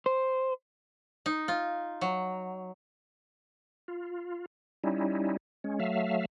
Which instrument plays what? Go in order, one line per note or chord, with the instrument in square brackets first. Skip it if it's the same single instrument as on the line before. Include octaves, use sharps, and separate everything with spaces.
[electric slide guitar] C5
[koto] D#4
F4
F#3
[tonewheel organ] F4
G3 C#4 D#4 E4
G#3 C#4
F#3 A3 E5 F5